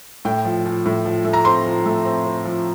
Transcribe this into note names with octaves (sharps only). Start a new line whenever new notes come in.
A2 G5
F3
F3
A2
F3
A3
A#5
C4 C6
F3
A3
C4
C4
F3